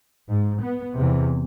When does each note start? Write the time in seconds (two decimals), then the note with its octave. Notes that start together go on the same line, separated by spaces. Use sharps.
0.28 G#2
0.62 B3
0.96 E2 C3